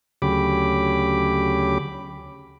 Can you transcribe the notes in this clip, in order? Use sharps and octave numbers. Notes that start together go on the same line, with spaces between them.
D2 C#3 F#3 G4 B5 D6